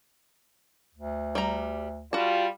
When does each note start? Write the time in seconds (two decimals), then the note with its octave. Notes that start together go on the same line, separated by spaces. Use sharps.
0.95 D2
1.35 G3 A#5
2.13 G3 F4 F#4 A5